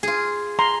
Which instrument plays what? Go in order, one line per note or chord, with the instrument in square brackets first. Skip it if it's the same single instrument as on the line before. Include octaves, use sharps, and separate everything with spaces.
[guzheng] F4 G#4
[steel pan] A#5 C6